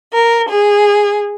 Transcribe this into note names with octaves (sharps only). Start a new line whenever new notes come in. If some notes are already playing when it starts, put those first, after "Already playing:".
A#4
G#4